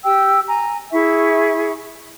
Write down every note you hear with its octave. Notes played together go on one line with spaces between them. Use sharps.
G4 G5 E6
G#5 A#5
E4 G#4 E5 C#6